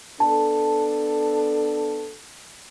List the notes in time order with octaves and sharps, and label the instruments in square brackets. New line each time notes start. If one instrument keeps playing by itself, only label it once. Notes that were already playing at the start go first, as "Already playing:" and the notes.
[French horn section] B3 D4 A4 [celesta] A5